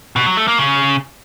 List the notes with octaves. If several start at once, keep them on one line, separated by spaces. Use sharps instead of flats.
B2
F#3
A3
A#3
C#3